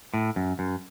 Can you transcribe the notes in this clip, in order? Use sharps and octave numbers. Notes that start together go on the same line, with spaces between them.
A2
F#2
F#2